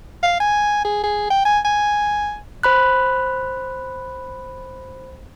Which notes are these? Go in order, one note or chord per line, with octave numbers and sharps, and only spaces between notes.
F5
G#5
G#4
G#4
G5
G#5
G#5
C5 B5 F#6